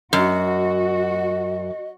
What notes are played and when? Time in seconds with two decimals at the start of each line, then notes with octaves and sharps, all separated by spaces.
0.13 F#2 F#4 D#5